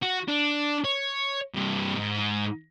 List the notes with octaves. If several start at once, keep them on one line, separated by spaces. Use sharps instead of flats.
F#4
D4
C#5
G2 C3
G#2